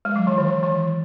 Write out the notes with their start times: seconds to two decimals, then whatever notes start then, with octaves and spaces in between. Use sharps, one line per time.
0.05 G#3
0.16 F#3
0.27 E3
0.38 D#3
0.47 E3
0.54 D#3
0.63 E3